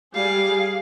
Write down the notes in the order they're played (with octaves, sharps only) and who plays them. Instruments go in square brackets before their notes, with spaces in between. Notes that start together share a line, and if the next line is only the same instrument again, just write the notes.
[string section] G3 G#4 [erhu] F5